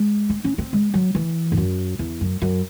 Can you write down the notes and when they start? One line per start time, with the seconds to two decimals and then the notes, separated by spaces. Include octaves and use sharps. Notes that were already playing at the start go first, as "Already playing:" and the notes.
Already playing: G#3
0.30 C4
0.44 C#4
0.58 C4
0.73 G#3
0.94 F#3
1.15 E3
1.52 G#2
1.57 F#2
1.99 E2
2.21 F#2
2.42 F#2